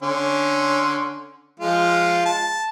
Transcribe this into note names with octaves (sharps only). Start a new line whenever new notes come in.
D3 C#4 C6
F3 G#3 F4
A5